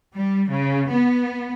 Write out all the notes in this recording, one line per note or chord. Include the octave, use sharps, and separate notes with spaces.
G3
C#3
B3